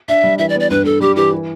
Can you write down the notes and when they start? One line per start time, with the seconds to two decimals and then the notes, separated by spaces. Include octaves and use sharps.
0.08 D4 E5
0.24 G3
0.38 E3 E5
0.49 D5
0.55 B3
0.60 D5
0.70 G2 B4
0.85 G2 A4
1.01 G3 G4
1.16 E3 G4
1.32 E3